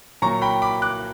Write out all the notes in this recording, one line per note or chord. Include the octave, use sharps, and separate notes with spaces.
A#2 F#3 A#3 A#5 C#6
G5 B5
B5 D6
D6 F#6